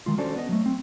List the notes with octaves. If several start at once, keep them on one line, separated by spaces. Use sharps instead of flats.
D#3 G#3 F4
C#4 D4 F#4 A4 C5 D5
B3 D#5
F#3 A3
C4